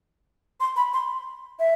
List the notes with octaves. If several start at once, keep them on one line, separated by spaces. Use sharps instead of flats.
C6
B5
C6
E5